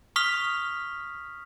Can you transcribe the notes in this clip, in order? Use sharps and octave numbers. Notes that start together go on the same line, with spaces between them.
C#6 D#6 F6 B6 F7